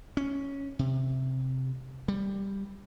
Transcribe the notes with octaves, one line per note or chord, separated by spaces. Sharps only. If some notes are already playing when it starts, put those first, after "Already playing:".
C#4
C3
G3